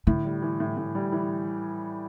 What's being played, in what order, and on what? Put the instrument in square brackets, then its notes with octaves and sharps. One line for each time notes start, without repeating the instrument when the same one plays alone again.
[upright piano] A2 [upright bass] D3
[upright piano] G3
E3
A2
A2
G3
E3